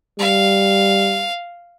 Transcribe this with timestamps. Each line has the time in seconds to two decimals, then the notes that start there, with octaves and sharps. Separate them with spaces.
0.19 G3 F5